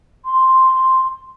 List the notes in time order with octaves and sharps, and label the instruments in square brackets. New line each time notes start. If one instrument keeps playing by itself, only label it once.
[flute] C6